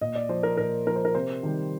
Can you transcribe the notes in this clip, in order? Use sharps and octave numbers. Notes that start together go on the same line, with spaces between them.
A#2 D#5
D5
F3 C5
A#4
A#2 A#4
F3 A#4
C5
A#4
C3 C5
D#3 G3